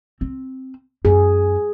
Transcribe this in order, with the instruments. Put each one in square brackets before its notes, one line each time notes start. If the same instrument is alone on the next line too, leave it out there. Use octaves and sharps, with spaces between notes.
[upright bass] C4
[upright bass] F#2 [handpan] G#4